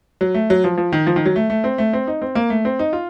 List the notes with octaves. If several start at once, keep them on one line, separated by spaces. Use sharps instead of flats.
F#3
A3
F#3
F3
F3
D#3
F3
D#3
F#3
A3
A3
C4
A3
C4
D#4
C4
A#3
A3
C4
D#4
F4